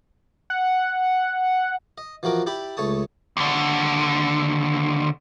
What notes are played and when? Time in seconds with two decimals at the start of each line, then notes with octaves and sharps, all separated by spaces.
0.50 F#5
1.98 D#5
2.23 E3 F3 F#4 A#4 D6
2.46 E4 G4 D5 B5
2.77 C#2 A3 C#5 A5 D#6
3.37 D#2 D3